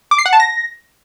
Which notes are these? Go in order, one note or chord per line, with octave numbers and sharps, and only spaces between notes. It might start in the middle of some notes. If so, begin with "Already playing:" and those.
D6
C7
F#5
A5
A#6